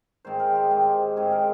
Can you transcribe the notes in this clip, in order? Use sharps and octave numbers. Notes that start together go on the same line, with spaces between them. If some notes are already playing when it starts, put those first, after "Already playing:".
G#2 D#3 G#3 C4 C5
A#4
G4
G#2 D#3 G#3 C4
G#2 D#3 G#3 C4 G#4
A#4